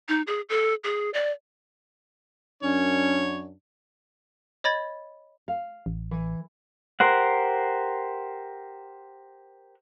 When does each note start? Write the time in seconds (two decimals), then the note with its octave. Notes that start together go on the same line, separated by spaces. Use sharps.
0.08 D#4
0.27 G#4
0.49 A4
0.84 G#4
1.14 D5
2.63 F#2 C#4 D4 C#5
4.64 C#5 D#5 B5 G#6 A6
5.48 F5
5.86 A1
6.11 E3
7.00 G4 A#4 C5 F#5